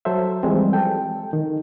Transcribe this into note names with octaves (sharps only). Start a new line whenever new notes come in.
F#3 A4 C5 E5
E3 F3 G3 G#3 C4
A4 G5
D#3